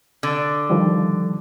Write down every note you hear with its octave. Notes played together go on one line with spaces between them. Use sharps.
D3
D#3 F3 G3